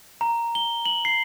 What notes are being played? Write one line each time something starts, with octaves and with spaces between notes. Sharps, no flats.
A#5
G7
F#7
C7